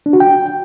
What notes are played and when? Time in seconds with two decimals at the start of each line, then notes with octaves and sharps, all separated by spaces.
0.06 D4
0.13 F#4
0.20 G5